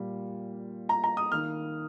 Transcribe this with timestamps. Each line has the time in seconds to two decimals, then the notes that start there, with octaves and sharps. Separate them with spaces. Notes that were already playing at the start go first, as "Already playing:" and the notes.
Already playing: A#2 G3 A#3
0.89 A#5
1.04 A#5
1.17 D#6
1.32 D#3 A#3 F6